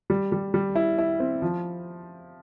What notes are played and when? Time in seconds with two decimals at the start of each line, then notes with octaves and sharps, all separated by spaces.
0.10 G3
0.32 G3
0.54 G3
0.75 E4
0.98 E4
1.20 C4
1.42 F3